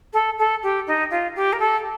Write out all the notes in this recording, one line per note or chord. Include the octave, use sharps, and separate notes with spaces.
A4
A4
G4
D#4
F4
G4
A#4
A4